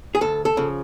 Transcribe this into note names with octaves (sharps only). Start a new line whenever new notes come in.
G#4
D2 A4
A4
C#3 F3